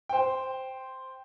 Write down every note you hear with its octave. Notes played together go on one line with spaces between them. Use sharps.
C5 G5